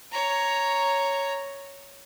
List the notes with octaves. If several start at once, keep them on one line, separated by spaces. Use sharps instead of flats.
C#5 A#5